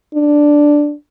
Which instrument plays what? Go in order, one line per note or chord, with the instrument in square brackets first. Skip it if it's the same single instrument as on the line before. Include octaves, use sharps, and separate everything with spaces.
[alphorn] D4